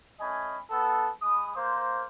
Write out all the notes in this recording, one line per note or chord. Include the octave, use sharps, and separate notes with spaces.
A3 C#4 D#5 G#5 B5
B3 A4
G#3 B5 D#6
A#3 C5